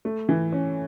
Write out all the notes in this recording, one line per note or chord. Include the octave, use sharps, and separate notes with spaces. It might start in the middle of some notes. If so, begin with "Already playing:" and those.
A3
E3
C#4